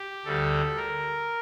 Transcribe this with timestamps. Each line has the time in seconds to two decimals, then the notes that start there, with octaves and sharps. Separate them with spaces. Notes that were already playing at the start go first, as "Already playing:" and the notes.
Already playing: G4
0.25 D2 D3 G3 A4
0.77 A#4